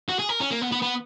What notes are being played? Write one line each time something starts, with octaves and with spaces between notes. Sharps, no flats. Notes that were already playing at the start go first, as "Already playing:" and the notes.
F#4
G#4
A#4
C#4
A#3
B3
B3
B3